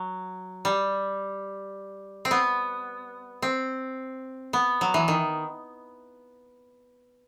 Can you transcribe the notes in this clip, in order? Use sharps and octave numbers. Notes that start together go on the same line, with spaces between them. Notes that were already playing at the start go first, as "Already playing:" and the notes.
Already playing: F#3
G3
C4
B3
C4
B3
F#3
E3
D#3